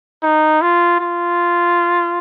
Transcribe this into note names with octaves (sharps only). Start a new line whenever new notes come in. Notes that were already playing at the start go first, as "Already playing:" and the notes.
D#4
F4
F4